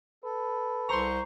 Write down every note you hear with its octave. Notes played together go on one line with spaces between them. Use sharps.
A4 B4
C2 C5 A#5 C6 C#6